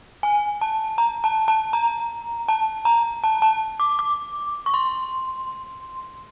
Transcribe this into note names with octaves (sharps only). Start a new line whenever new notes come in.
G#5
A5
A#5
A5
A5
A#5
A5
A#5
A5
A5
D6
D6
C#6
C6